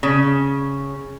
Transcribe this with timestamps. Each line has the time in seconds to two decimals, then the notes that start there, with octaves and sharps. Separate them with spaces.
0.03 C#3